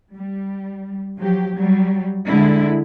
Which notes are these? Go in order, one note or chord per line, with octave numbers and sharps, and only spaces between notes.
G3
F3 F#3 G4
F#3 G3
D3 G#3 E4